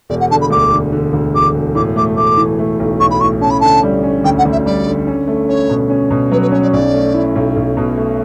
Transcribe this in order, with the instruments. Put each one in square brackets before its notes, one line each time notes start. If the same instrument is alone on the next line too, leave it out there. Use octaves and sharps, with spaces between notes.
[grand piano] E1 [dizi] D5
[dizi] F#5
[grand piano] D3 [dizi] A5
[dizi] B5
[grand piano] D2 [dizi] D6
[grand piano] D3
D3
D2
[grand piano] E1 [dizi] D6
[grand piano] E1
[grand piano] A2 [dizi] D6
[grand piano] A3 [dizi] D6
[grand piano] A3 [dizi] D6
[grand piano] E3
A3
B1
[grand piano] B1 [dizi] C#6
[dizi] B5
[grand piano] A2 [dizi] C#6
[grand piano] C#4 [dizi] A5
[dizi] B5
[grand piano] D3 [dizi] A5
[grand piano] G3
C#4
[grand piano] D2 [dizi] G5
[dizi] F#5
[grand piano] D2
[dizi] E5
[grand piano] G3 [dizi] D5
[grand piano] D3
C#4
A3
[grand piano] C#4 [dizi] C#5
[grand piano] B2
C#4
B2
[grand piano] F#3 [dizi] B4
[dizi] B4
[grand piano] C#4 [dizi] C#5
[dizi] D5
[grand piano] B1 [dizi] D5
[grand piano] A3
E4
B1
B1
B2
A3